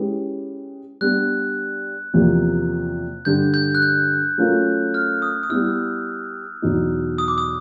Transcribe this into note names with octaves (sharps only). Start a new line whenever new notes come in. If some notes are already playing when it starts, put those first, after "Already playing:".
Already playing: G#3 C#4 E4 G4 B4
G3 B3 D4 F#6
E2 C3 F3 A#3
G2 D3 G3 G6
G6
F#6
G6
F#3 A3 C#4 F4 A#4
F6
D#6
D#6
G3 B3 E4 E6
E2 B2 F#3 B3 D#4
D#6
D6
D#6